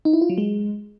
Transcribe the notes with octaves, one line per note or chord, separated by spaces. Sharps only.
D#4
E4
F4
F#3
G#3